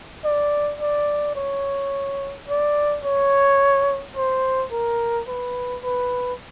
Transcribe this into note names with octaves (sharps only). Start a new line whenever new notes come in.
D5
D5
C#5
D5
C#5
C5
A#4
B4
B4